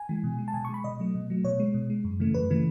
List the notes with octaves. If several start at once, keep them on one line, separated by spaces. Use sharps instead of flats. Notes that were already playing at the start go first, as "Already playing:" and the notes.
Already playing: G#5
E3 G#3
B2
G#3
A5
B2 G#5
C#6
G#3 B5
B2 D#5
F#3 A3
B2
F#3 A3
B2 C#5
G#3
B2
G#3
F#2
C#3 E3 A3
F#2 B4
C#3 E3 A3